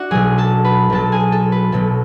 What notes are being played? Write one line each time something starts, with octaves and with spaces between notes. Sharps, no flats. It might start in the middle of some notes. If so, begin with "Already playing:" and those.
Already playing: D4 F#4 D5 F#5
B1 B2 F#3 G#4 G#5
A4 A5
B4 B5
B1 B2 F#3 A4 A5
G#4 G#5
A4
B4
B1 B2 F#3 A4